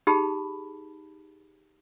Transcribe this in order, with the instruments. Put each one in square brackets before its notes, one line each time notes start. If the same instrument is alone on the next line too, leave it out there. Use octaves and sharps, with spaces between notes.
[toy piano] D#4 G4 G#4 A5 B5